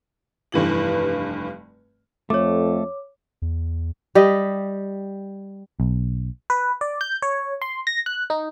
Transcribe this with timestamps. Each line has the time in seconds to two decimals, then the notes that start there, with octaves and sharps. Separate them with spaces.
0.52 F1 G2 E3 F#7
2.30 F2 A3 C#5 D6
3.42 E2
4.15 G3 G4 D#5
5.80 B1
6.50 B4
6.81 D5
7.01 G6
7.22 C#5
7.62 C6
7.87 A#6
8.06 F#6
8.30 D#4